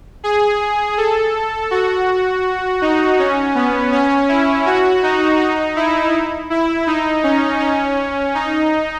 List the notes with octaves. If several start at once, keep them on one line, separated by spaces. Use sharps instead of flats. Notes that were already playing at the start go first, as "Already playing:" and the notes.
G#4
A4
F#4
D#4
C#4
B3
C#4
E4
F#4
D#4
D#4
E4
E4
D#4
C#4
C#4
D#4